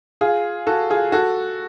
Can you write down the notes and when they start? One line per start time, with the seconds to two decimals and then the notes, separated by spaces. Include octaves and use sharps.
0.21 F4 G#4
0.67 F#4 A4
0.90 F4 G#4
1.12 F#4 A4